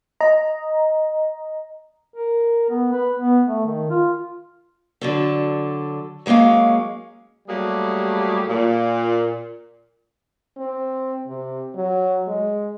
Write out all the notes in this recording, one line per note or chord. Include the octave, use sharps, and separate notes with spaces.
D#5 A#5
A#4
B3
B4
B3
A3
D#3
F4
D3 F#3 A4
F#3 G#3 A#3 C#4 F5
F#3 G3 A3 A#3 G4 G#4
A#2
C4
C3
F#3
G#3